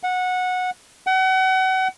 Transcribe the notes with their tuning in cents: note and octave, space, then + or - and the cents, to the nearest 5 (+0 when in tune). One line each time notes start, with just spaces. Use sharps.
F#5 -15
F#5 +35